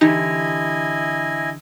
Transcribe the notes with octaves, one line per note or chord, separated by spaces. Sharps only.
D3 E3 D#4 E4 G4 D#5 G#5